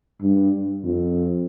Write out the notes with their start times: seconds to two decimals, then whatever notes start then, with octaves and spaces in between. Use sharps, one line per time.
0.22 G2
0.84 F2